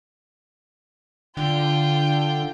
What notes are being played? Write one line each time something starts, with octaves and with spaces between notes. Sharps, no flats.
D3 F4 G5